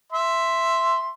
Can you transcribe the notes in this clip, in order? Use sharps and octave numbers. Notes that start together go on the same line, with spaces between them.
E5 C6